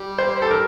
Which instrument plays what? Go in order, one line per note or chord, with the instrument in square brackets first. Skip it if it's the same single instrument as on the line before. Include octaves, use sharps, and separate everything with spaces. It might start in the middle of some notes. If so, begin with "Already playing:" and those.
Already playing: [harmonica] G3
[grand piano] C5
A4
A#4